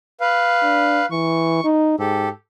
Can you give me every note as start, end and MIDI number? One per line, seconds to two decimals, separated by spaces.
0.20 1.06 71
0.20 1.06 77
0.63 1.02 62
1.11 1.62 52
1.11 1.66 85
1.64 1.97 63
1.99 2.29 44
1.99 2.29 67
1.99 2.29 69